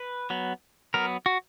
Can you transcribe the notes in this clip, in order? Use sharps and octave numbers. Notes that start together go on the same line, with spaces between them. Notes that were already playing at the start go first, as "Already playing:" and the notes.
Already playing: B4
F#3 B3
F#3 B3 A#4
F#4